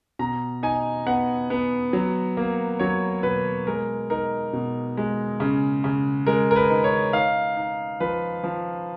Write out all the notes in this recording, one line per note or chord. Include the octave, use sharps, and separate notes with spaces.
B2 A#5
D#4 G#5
B3 F#5
B3
F#3
A#3
F#3 C#5
B2 B4
G#3 A#4
D#4 A#4
B2
G#3
C#3
C#3
G#3 A#4
A#4
B4
D#4
C#5
D#4 F5
D#4
F3 B4
F3